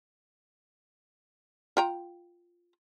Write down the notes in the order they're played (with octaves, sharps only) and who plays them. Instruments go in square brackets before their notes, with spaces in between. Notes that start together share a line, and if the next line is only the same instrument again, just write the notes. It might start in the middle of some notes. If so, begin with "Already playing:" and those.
[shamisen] F4 G5 A#5